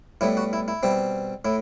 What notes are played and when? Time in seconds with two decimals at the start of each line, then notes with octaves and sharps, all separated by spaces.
0.21 A2 G3 B3 E4
0.37 F#4
0.53 E4
0.68 E4
0.83 B2 G3 C4
1.45 A2 E4